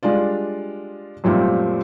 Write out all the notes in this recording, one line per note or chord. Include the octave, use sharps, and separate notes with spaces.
G3 G#3 D4 F4 D5
F#2 A#2 F3 G3 A3 C4